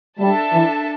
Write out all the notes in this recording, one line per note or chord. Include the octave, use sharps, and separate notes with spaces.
G3 D4 A4 E5 A5
E3